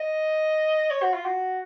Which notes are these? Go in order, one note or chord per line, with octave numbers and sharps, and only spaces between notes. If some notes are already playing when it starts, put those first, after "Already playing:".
Already playing: D#5
C#5
F#4
F4
F#4